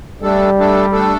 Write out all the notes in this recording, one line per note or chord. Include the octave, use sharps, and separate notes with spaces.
G3 A3 D4 A4
A3 D4 A4
A3 D4 A4